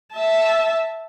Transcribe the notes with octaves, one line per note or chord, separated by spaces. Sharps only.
E5 A5